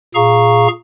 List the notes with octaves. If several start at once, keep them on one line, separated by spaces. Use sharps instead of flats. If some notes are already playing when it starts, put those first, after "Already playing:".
A#2 G#4 F5 A#5 C#6